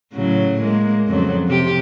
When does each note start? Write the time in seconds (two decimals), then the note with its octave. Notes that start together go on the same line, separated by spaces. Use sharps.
0.13 A2 C#3 F#3
0.62 G#3 A#3
1.07 F2 C#3 F#3
1.48 C3 G4